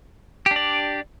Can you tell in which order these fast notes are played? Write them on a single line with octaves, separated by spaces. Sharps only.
G4 D4 D5